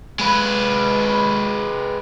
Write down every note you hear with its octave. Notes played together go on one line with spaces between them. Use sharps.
G#3 B4